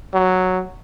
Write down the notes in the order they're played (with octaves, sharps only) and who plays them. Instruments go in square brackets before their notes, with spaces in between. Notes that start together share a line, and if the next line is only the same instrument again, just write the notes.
[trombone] F#3